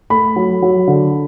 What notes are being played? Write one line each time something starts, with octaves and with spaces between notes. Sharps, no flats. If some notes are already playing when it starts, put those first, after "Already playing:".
A3 B5
F#3
F#3
D3